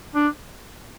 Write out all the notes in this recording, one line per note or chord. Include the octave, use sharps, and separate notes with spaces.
D4